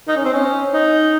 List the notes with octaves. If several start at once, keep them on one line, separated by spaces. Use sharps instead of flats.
D#4
C#4
C4
C#4
D#4